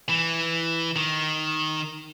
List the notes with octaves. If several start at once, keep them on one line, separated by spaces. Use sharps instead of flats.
E3
D#3